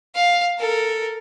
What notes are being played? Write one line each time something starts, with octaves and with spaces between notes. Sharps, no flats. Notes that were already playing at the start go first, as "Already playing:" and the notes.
F5
A4 A#4